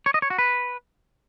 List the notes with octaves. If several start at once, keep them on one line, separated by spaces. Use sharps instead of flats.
C#5
D#5
C#5
F#4
B4